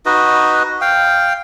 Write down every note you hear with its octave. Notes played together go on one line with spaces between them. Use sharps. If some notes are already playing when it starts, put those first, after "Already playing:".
D#4 F#4 B4 D#5
F5 G5